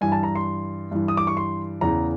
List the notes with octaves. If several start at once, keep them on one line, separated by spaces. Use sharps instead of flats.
G2 E3 G#5
A5
A#5
C6
G2 E3
D#6
D6
C#6
C6
E2 C#3 E3 A#5